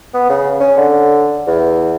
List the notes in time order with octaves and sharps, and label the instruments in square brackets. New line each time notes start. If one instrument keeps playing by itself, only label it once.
[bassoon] B3
C#3
C#4
D3
E2